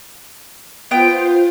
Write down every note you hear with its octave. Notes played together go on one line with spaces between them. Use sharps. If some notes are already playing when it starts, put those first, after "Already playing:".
B3 F4 C5 G5